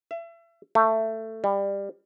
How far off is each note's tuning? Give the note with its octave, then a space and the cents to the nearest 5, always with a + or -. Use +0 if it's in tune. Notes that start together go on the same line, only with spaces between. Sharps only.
E5 +35
A3 +15
G3 +20